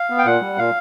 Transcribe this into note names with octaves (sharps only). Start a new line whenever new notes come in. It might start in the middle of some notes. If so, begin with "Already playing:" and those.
Already playing: F5
B3
G5
A#2 F#5
G3
A#2 F5